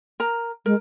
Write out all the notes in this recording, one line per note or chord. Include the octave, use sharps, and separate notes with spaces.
A#4 A#5
G#3 A#4